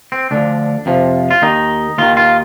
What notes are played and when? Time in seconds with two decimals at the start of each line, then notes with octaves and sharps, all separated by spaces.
0.12 C4
0.31 D2 D3 F3 D4
0.86 F2 C3 F3
1.31 F4
1.42 D#2 D#3 D#4
1.98 D#2 D#3 F4
2.17 F4